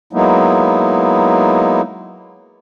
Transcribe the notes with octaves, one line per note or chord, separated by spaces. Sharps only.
F#3 G#3 A#3 B3 D#4 E4